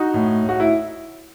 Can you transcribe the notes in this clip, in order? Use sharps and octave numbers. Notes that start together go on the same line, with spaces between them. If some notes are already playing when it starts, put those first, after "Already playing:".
Already playing: D#4 F#4
A2
A2
F#4
E4